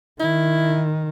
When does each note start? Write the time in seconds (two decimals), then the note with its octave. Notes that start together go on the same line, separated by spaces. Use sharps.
0.20 D#3 E4